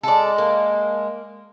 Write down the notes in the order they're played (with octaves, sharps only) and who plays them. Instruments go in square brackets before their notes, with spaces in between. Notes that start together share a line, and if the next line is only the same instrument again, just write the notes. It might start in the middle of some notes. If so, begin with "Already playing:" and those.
[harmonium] G#3 [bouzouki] A4 D5
[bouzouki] A#3